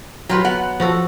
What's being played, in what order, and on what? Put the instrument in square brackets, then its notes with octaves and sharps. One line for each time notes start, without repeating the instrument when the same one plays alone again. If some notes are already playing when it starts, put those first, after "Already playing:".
[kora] F#3 B4 [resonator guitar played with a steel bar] F4 G4
[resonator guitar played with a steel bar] B3 F#5
[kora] F3 F#4 A4